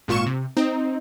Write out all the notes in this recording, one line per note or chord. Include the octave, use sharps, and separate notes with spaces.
G#1 A#2 F4 C#6 E7
C3
C4 D#4